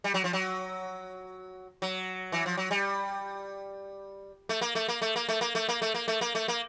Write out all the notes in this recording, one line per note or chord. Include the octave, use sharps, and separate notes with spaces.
G3
F#3
F3
F#3
F#3
E3
F3
F#3
G3
A3
A#3
A3
A#3
A3
A#3
A3
A#3
A3
A#3
A3
A#3
A3
A#3
A3
A#3